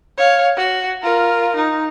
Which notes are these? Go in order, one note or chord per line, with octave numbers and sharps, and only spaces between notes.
C#5 F5
F#4
F4 A#4
D#4